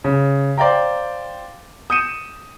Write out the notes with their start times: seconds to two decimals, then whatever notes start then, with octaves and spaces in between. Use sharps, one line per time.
0.04 C#3
0.58 C5 D5 F5 G5 A#5
1.90 D#6 G6 C#7 D#7 E7